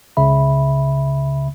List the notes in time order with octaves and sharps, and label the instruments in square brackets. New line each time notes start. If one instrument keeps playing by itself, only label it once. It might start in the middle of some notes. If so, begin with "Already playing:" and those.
[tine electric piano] C#2 C#3 E5 B5